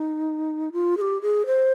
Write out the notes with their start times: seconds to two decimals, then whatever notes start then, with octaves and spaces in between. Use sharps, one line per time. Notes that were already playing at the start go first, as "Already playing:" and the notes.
Already playing: D#4
0.72 F4
0.97 G#4
1.01 G4
1.22 G#4
1.46 C5